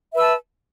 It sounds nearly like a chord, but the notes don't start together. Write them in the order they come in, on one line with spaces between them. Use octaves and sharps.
E5 B4 E6 A5